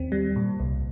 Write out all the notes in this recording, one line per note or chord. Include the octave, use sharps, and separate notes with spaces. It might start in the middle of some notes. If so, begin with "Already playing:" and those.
Already playing: D#2 D#3 C4
G3
A#2
C2